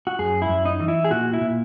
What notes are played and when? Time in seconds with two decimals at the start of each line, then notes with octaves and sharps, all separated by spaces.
0.07 F#4
0.19 F#2 G#4
0.42 E4
0.49 F#2
0.65 D#4
0.80 E3
0.88 E4
1.04 G#4
1.11 A#2 F#4
1.33 E4
1.41 A#2